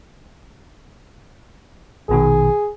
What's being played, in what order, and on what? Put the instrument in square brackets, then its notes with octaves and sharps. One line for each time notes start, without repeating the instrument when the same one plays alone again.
[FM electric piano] A#1 B2 D#3 [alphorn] G#4